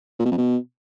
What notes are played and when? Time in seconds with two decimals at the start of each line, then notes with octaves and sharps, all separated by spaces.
0.19 A#2
0.25 B2
0.31 F2
0.37 B2